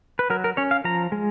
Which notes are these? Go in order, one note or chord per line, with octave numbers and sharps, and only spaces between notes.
B4
F#3 A#4
A#4
C#4 C#5
F5
F3 A#5
G#3